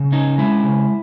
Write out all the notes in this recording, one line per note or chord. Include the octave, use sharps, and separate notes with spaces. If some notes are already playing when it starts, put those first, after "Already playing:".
Already playing: C#3
C#4 D#4
G#3 E4
C#3